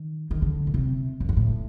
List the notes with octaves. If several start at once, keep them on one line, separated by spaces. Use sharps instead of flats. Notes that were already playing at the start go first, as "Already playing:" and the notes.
Already playing: D#3
D#3
D3
A#2
C3
F#2
G2
A2